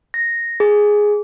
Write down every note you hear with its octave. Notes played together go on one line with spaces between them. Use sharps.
A#6
G#4